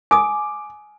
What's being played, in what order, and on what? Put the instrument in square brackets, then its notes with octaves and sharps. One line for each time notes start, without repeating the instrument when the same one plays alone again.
[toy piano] G#5 D#6 [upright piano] D6